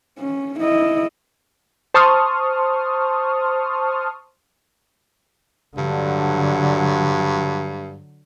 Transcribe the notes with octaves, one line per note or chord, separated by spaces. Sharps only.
C#4
E4 D#5
C5 A5 C6 C#6 D#6 F6
G2 D3 F#3